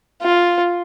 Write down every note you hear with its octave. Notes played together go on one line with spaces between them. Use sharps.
F4